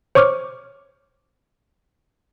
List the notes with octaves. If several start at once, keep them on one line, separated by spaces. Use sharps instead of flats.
C5 C#5 C#6 D6 F6